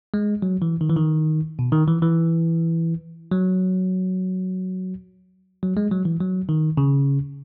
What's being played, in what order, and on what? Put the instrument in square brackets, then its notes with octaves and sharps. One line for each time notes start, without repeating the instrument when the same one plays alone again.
[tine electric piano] G#3
F#3
E3
D#3
E3
D#3
B2
D#3
E3
E3
F#3
F#3
G#3
F#3
E3
F#3
D#3
C#3